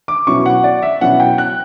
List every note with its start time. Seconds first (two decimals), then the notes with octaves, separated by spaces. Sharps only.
0.08 D6
0.27 B2 F#3 C#4 E4 C#6
0.46 F#5
0.64 D5
0.82 E5
1.01 B2 F#3 C#4 E4 F#5
1.20 G5
1.38 F#6